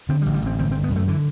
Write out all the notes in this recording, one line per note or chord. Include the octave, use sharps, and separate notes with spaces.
D3 C4
G3
A1
G3
A1 C4
G1 C4
G1 C4
B3
F#2 A3
D3 E3